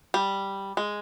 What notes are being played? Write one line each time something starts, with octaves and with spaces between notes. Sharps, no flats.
G3
G#3